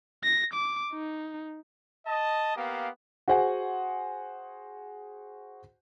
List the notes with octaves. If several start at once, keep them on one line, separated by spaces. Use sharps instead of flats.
A#6
D6
D#4
D#5 A5
A#3 B3 G4 F5
F#4 G#4 C5 F#5 G#5